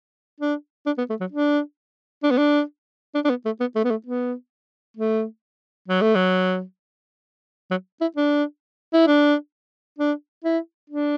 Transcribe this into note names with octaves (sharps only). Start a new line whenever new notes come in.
D4
D4
B3
A3
F#3
D4
D4
B3
D4
D4
D4
B3
A3
B3
A3
B3
A3
B3
A3
F#3
A3
F#3
F#3
E4
D4
E4
D4
D4
E4
D4